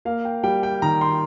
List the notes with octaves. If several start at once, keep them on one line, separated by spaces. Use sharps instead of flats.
A#3 F5
G5
G3 G5
G5
D#3 A#5
C6